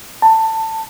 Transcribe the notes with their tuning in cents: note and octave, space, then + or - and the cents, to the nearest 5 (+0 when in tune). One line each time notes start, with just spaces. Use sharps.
A5 +20